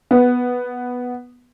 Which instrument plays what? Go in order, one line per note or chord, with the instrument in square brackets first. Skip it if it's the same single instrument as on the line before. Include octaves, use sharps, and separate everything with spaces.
[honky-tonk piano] B3